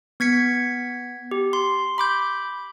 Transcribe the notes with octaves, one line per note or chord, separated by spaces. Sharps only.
B3 G#6 B6 C#7
G4
C6
B5 D6 G6